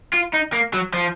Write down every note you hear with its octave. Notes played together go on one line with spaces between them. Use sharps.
F4
D#4
A#3
F#3
F3